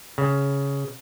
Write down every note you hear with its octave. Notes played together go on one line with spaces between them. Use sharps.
C#3